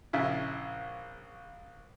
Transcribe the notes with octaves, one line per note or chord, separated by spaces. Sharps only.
A#1 C#3 E4